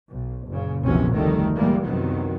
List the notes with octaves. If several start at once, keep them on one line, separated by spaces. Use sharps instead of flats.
B1
F#1 A#2 C#3
A#1 E2 C3 F#3 C#4
F1 D2 D#3 G3 A3
A#2 E3 G3 G#3 A#3
C2 F#2 D#3 F#3 B3